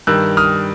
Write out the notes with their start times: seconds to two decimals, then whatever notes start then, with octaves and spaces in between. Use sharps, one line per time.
0.07 G2 D#3 G3 E6 F#6
0.37 D#6 F6